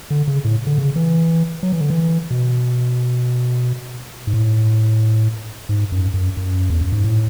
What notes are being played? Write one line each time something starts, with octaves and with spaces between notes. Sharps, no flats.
D3
C#3
A2
D3
C#3
E3
F#3
E3
D3
E3
B2
G#2
A2
G#2
F#2
F#2
F#2
E2
F#2
G#2
A2